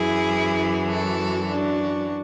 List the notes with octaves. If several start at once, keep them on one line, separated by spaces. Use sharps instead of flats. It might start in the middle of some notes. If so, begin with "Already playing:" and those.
Already playing: F#2 E3 E4 G#4
F#4 A4
D4 F#4